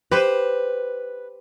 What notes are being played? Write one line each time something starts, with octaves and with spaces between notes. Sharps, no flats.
G4 B4 C5